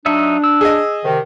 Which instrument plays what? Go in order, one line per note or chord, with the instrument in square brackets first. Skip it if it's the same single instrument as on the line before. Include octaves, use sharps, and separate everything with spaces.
[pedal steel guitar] F#3 D#4 E5 [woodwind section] D4
[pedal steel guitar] E6
[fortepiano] G#4 D#5
[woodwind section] C3 D#3